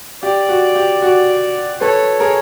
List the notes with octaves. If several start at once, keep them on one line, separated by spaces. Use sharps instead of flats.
G4 D5
F#4
G4
F#4
A4 B4 C#5
G#4 A#4